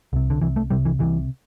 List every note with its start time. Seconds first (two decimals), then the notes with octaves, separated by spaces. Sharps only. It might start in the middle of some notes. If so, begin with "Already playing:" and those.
0.13 C2 C3
0.30 D3
0.41 C2 C3 E3
0.56 A3
0.70 C2 C3 G3
0.85 E3
0.99 C2 C3 E3